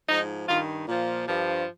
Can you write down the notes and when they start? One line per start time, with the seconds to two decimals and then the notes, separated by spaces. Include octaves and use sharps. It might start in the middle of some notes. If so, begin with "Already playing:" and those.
0.08 G#2 F3 D#4
0.48 G2 D#3 F4
0.88 A#2 F3
1.27 G2 F3